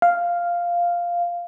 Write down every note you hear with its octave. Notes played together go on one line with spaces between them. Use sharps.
F5